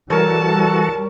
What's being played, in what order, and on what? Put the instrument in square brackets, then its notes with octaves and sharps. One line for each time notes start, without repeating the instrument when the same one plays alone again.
[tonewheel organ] E3 F#4 A4 [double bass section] G3 [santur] A#4 C#5 [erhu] A5